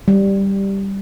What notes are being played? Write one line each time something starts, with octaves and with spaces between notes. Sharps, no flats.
G3